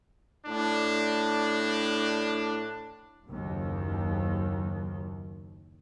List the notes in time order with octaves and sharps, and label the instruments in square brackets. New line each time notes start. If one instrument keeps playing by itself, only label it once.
[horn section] A2 D4
[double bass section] F#1 D#2